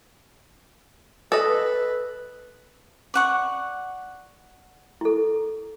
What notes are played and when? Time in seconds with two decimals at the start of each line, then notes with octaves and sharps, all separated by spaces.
1.32 A4 B4 D#5
3.14 D5 F#5 C#6
5.01 E4 A4